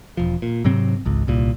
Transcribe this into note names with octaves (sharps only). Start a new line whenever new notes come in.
E1 F3
A#2
G#2 C3 F#3 C4
G#1 C#2
D#1 C2 A#2